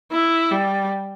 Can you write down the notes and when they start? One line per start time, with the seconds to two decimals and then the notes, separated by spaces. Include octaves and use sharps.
0.12 E4
0.51 G3